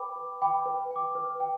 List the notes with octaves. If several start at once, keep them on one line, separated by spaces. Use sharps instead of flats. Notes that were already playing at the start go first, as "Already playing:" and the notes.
Already playing: B4 G5 B5 D6
B4
G5 B5 D6
B4
G5 D6
B4
G5